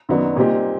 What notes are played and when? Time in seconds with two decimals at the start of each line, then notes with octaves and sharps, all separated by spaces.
0.09 F#2 D#3 F#3 B3 D4
0.36 A#2 G3 C4 D#4 G4